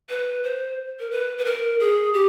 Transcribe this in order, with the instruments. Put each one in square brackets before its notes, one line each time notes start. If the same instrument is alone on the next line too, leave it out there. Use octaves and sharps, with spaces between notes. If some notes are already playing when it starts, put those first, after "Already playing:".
[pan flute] B4
C5
A#4
B4
B4
A#4
G#4
G4